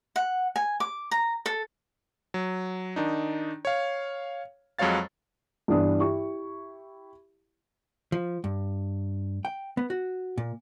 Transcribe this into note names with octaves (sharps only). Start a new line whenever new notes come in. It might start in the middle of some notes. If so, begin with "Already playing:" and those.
F#5
G#5
D6
A#5
A4
F#3
D#3 D4 D#4
C#5 F5
F2 F#3 G#3 C#5 F5 A6
G2 E3 B3 D4 D#6
E4 G4 C#6
F3
G2
G5
B3
F#4
A#2